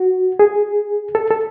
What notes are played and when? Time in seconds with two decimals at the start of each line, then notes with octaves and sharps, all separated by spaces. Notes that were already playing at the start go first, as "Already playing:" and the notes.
Already playing: F#4
0.39 G#4
1.15 A4
1.30 A4